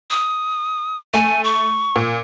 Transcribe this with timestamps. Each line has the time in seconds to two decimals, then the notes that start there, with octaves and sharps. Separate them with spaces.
0.10 D#6
1.14 A3 G#5
1.44 C#6
1.96 A#2